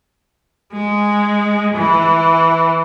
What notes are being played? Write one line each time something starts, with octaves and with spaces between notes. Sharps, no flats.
G#3
E3